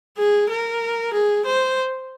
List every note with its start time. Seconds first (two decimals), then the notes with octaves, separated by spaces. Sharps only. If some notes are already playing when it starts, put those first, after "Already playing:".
0.18 G#4
0.49 A#4
1.13 G#4
1.45 C5